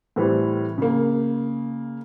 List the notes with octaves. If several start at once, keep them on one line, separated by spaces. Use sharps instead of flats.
A2 E3 G3 C4
C#3 A#3